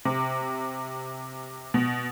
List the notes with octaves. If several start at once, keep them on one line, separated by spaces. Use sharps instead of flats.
C3
B2